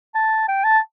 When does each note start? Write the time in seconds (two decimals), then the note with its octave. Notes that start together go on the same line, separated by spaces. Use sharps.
0.15 A5
0.48 G5
0.64 A5